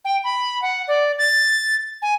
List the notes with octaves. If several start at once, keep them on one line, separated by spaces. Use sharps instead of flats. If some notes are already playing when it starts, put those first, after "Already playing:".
G5
B5
F#5
D5
A6
G#5